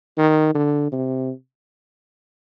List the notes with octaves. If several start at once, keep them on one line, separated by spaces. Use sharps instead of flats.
D#3
D3
C3